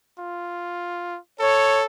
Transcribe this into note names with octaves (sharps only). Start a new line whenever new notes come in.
F4
A4 C#5